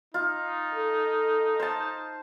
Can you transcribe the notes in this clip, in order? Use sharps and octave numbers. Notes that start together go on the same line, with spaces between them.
D#4 F4
A4
C5 A5